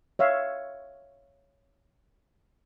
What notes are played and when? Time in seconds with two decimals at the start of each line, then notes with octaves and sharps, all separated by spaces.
0.19 C#5 E5 F5